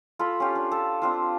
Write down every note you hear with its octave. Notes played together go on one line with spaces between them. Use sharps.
F4 A4 B5
C#4 F4 G4
D4
A4
C4 D4 F4